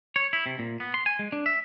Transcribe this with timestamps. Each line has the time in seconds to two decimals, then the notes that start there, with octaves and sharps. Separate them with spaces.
0.16 C#5
0.33 E4
0.46 C3
0.59 A#2
0.80 B3
0.94 C6
1.06 G#5
1.19 G#3
1.32 D4
1.46 E5